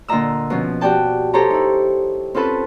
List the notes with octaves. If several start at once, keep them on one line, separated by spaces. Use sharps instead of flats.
A#2 D3 F4 D#5 A#5 E6
B2 F3 C#4
F#4 G4 D5 G5 A5
G4 A4 C5 C#5 G5 A#5
D#4 E4
C4 C#4 F4 A4 B4